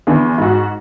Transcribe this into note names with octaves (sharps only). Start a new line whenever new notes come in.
E2 D3 E3
G#2 F#4